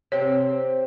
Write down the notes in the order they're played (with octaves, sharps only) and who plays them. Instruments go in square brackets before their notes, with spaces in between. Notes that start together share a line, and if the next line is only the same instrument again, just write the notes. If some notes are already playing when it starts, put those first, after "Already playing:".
[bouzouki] C3 C4 [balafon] C#5